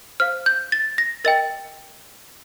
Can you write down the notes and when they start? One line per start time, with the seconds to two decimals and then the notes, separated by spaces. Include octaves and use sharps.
0.20 C5 F5 F6
0.46 G6
0.72 A6
0.98 A#6
1.24 A#4 D#5 G5 A6